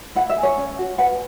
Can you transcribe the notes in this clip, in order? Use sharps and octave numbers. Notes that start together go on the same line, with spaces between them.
E4 F#5
E5
G#4
C#5
C#4
F#4
B4 F#5